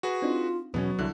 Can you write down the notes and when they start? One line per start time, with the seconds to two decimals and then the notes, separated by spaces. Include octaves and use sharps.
0.03 F#4 G#4 B4
0.22 C4 D4 D#4 F4
0.74 E2 B2 F#3 B3 C#4
0.99 C2 D3 E4 F#6